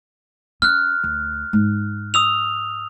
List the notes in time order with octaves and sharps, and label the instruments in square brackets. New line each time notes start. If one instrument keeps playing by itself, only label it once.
[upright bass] C#4 [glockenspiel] F6 F#6
[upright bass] D2
G#2
[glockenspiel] D#6 E6 F7